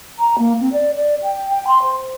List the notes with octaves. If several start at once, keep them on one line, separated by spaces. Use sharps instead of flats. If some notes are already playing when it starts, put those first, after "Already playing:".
A#5
A#3
C4
D5
D5
G5
G5
C6
C5